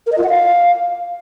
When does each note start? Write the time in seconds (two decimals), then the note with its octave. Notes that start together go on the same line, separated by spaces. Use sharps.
0.07 A#4
0.12 D#5
0.18 F4
0.24 F#5
0.29 F5